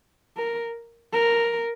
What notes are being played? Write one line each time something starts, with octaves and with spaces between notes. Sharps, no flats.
A#4
A#4